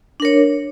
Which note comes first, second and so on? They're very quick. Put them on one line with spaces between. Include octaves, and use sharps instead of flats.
D4 A#4 C#5